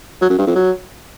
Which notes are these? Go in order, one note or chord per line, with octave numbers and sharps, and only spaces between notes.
F#3
F#2
G2
F2
F#3